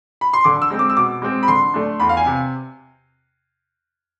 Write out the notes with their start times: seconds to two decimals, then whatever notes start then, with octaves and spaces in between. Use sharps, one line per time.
0.21 B5
0.33 C6
0.44 D3 D6
0.62 E6
0.71 G#3 C4
0.79 D6
0.90 E6
0.97 B2 D6
1.22 G#3 C4
1.43 B5
1.48 D3 C6
1.74 A3 D4
2.00 E2 B5
2.09 F5
2.17 G#5
2.26 C3